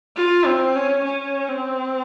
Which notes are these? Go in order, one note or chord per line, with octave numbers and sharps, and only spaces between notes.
F4
C4
C#4
C#4
C4